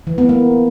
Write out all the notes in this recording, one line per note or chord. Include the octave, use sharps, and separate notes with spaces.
E3
B3
A#3